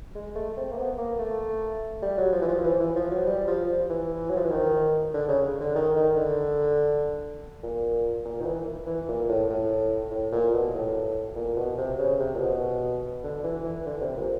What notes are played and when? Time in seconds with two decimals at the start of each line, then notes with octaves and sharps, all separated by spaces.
0.15 G#3
0.35 A3
0.57 C4
0.71 A#3
0.77 B3
0.98 A#3
1.19 A3
2.02 G3
2.17 F#3
2.32 F3
2.41 E3
2.48 F3
2.63 E3
2.80 E3
2.96 F3
3.11 F#3
3.26 G3
3.48 F3
3.89 E3
4.30 F#3
4.36 F3
4.44 E3
4.51 D#3
5.14 D3
5.29 C#3
5.61 D3
5.75 D#3
5.96 D#3
6.16 D3
7.63 A#2
8.25 A#2
8.40 D#3
8.46 E3
8.86 E3
9.08 A#2
9.29 A2
9.50 A2
10.11 A2
10.32 A#2
10.53 B2
10.74 A2
11.36 A#2
11.56 B2
11.78 C3
11.99 C#3
12.20 C3
12.35 A#2
12.40 B2
13.24 D3
13.44 E3
13.64 E3
13.86 D3
14.01 C3
14.17 A#2